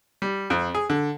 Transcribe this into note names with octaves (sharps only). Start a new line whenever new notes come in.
G3
F2
G#4
D3